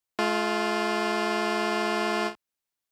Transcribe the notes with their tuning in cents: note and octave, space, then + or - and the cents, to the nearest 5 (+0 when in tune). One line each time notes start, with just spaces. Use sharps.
A3 -45 F4 +0